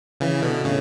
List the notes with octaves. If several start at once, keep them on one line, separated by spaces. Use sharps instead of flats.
C#3 E3
B2 D3
A2 C#3